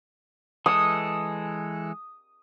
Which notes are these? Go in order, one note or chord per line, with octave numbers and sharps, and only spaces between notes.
E3 G#3 A4 D#6